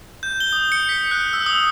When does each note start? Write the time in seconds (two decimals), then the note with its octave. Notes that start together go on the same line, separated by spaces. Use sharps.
0.23 G6
0.40 G7
0.53 D#6
0.72 C#7
0.89 B6
1.11 F#6
1.33 E6
1.46 D#6